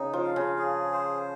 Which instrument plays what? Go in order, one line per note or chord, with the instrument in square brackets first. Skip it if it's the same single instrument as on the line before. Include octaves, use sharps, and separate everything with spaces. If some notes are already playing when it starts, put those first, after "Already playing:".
Already playing: [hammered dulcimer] C#3 [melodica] D#4
[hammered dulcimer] F3
[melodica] F5
[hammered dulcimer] C#3
[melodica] G#4
C5